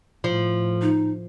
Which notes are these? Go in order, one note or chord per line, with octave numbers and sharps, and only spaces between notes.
A2 F3
D#4